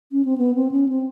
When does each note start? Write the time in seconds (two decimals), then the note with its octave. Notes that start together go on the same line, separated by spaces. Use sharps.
0.12 C#4
0.25 C4
0.38 B3
0.55 C4
0.71 C#4
0.89 C4